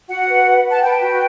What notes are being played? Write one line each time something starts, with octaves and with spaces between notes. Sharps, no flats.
F#4 F#5
B4
B4
B4
A5
B4 G5
F#4